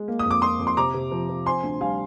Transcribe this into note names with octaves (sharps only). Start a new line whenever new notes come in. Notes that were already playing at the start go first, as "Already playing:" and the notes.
Already playing: G#3
A#3
D#6
F2
D6
A#3 C6 D#6
F2
C6
C3 A#5 D6
C3
F3
F3
C4 G#5 C6
D2
G3 F5 G#5